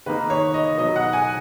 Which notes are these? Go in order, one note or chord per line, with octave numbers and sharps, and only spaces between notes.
D#3 A#3 D#4 B4
C#5
D#5
B2 F#3 B3 D#4 D#5
F#5
G#5